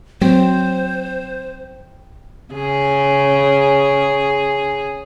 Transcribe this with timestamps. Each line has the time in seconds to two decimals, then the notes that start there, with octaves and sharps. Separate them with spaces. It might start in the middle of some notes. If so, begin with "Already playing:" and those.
0.21 F#3 C4 C5
2.54 C#3 G#4